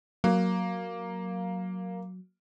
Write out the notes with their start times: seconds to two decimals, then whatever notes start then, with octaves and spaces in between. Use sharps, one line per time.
0.24 F#3 A#3